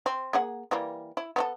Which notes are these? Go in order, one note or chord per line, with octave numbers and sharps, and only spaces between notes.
C4
A#3 G#4 F#5
E3 G3 A#3
E4
B3 C4 A4